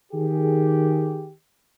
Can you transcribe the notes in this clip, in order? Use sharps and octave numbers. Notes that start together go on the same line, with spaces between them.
D#3 G4 G#4